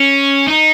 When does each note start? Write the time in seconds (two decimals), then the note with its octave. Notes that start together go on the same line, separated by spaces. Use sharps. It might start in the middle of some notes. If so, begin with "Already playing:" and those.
Already playing: C#4
0.48 D#4